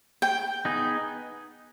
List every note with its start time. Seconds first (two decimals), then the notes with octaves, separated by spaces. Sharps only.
0.22 G5
0.65 B3 D#4 G#4